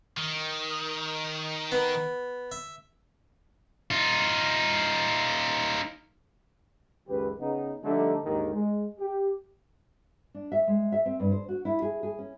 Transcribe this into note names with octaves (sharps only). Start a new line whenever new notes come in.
D#3
B3
E5
D#4 F4
C#2 F#2 D#3 G4 B4
C#3 B3 D#4
D3 F3 G3 A3 D4 D#4
D#2 G#2 D3 D#3
G#3
G4
D4
E5
G#3
E5
C4
G2
C5
F#4
E4
G#4
G#4
C#4